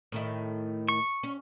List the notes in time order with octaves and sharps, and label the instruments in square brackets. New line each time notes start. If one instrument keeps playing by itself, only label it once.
[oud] A2 D#3 E4
[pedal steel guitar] C#6
[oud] C#4